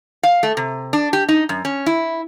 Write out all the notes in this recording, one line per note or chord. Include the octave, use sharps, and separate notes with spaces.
F5
A3
C3
D4
G4
D#4
F#2
C#4
E4